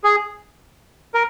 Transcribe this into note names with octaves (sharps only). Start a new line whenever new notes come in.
G#4
A#4